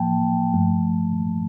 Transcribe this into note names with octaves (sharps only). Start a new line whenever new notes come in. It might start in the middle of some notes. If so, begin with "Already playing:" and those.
Already playing: A2 F3 A#3 G5 A5
G2 F3 A3